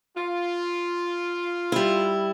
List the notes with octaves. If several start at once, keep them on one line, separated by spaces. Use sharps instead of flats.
F4
G3 E4